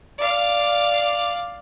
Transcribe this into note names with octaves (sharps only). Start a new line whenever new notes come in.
D5 F5